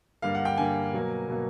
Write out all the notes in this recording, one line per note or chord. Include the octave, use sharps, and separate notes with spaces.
G2 D3 G3 A#3 F5
F#5
G5
G2 D3 G3 A#3 G#5
B2 F#3 A#3
B2 F#3 A#3